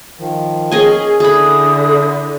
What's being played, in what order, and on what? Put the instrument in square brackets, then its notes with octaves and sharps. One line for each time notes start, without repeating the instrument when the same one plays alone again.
[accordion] D#3 F3
[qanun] C#4 D#5 G#5 [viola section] G#4
[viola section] D3 [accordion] E4 [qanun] G#4 B5 [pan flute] D#6